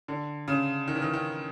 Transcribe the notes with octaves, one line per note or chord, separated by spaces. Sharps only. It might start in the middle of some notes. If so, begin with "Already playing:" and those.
D3
C#3
D#3
E3
D#3
D#3